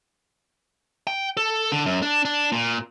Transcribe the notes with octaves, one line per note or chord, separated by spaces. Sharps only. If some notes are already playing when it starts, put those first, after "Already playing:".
G5
A4
D3
F#2
D4
D4
A#2